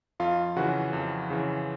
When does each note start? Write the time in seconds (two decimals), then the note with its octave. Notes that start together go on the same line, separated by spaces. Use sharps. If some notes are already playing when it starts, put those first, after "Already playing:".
0.20 F2 F4 F5
0.57 C#3 E3 F#4 F#5
0.93 F2
1.30 C#3 E3